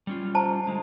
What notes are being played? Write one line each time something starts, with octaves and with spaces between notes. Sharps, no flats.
G3 C#4 F4
C5 A5 A#5
D3 G#3